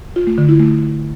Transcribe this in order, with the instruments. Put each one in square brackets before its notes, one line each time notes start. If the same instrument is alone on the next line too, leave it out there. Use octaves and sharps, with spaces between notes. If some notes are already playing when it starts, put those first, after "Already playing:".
[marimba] F4
A3
D3
E4
A3